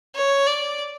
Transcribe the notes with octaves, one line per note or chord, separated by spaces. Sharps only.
C#5
D5